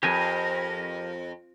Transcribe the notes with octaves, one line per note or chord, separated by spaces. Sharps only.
F2 G4 A#4 G#5